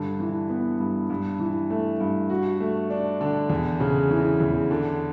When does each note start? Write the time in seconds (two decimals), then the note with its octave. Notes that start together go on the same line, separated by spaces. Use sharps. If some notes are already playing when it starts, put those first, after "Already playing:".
Already playing: G2 D3
0.20 E3
0.49 B3
0.80 G2
1.10 G2
1.39 E3
1.70 A3
2.00 G2
2.30 F#4
2.60 A3
2.90 D4
3.21 D3
3.50 E2
3.80 C#3
4.11 E3
4.40 E2
4.71 D3